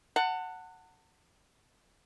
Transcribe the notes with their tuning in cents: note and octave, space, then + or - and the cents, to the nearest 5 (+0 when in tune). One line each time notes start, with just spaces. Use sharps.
F#5 +0 A5 +35